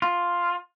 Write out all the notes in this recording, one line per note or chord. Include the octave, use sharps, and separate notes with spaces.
F4